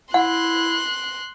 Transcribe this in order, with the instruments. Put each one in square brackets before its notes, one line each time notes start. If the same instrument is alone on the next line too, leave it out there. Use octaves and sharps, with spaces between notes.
[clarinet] E4 [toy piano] F#5 [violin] C6 F#6